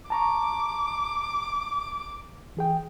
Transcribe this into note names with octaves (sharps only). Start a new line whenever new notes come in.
A5 A#5 C#6 D6
E3 G#4 G5